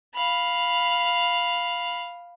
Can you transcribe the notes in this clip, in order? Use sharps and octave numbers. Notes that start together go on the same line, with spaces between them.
F5 B5